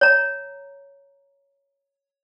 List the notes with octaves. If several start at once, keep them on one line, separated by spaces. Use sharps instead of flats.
C#5 A#5